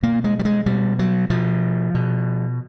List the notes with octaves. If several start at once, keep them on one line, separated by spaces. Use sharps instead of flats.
B2 A#3
G#3
G3
G#3
B2 G3
F#3
B2 F3
B2